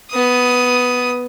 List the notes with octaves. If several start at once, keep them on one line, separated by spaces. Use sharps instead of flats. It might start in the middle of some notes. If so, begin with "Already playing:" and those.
B3 D#6